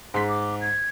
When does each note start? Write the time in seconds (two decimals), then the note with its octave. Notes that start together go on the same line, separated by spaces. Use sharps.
0.14 G#2 C6 B6
0.28 D6
0.61 G#6